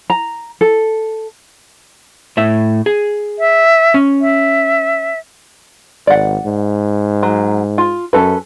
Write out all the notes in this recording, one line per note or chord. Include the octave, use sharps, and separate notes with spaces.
A#5
A4
A2 E5
G#4
E5
C#4
E5
G#1 D5 F#5
G#2
F#3
F4
F#2 C#4 A4 B4